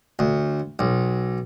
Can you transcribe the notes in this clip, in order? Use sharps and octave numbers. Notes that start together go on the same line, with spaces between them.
D2
B1